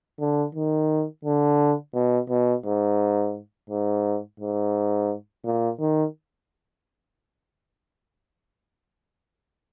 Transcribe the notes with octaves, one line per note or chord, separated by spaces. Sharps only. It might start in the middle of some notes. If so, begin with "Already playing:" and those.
D3
D#3
D3
B2
B2
G#2
G#2
G#2
A#2
D#3